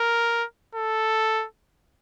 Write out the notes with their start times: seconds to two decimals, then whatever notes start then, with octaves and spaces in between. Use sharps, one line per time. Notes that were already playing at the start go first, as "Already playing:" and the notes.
Already playing: A#4
0.75 A4